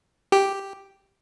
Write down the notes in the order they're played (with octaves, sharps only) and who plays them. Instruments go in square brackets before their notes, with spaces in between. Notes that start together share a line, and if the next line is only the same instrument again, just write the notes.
[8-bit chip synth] G4